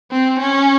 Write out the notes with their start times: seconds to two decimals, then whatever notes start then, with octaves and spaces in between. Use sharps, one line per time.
0.11 C4
0.39 C#4